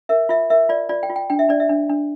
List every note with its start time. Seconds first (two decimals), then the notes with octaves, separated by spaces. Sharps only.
0.09 A#4 E5
0.29 F4 E5
0.50 A#4 E5
0.69 F4 D5
0.89 F4 D5
1.03 G5
1.10 F4
1.16 G5
1.30 D4 G5
1.39 E5
1.49 D4 D5
1.60 E5
1.69 D4
1.90 D4